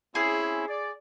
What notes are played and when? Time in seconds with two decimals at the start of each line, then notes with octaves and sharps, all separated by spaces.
0.15 C4 C#4 E4 G#4
0.67 D5